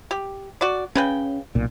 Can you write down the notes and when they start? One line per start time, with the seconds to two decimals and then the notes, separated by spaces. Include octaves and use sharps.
0.11 G4
0.61 F#4 D5
0.95 C#3 C#4 B4 G5
1.55 B1 A#2